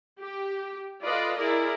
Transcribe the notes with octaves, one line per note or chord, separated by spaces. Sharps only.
G4
F4 A4 B4 D5 D#5
E4 G#4 A#4 D5